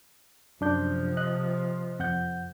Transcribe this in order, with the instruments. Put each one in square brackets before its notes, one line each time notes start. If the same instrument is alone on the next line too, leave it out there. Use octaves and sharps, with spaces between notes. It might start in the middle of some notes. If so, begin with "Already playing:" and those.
[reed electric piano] F#2 D4 G6 [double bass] C3 F3
[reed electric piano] D#5 F#6
F2 F#5 G6